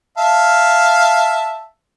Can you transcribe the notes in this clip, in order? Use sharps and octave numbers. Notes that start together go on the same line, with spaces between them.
E5 F5 A5